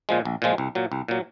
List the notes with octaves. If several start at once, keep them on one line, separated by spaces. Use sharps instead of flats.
A#2 F3 G#3
A#1
A#2 F3 G#3
C2
A#2 F#3
C2
A#2 F#3